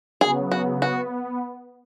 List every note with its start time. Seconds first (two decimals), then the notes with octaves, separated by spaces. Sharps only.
0.21 C#3 F#3 B3 G#4
0.52 F#4
0.82 B3 F#4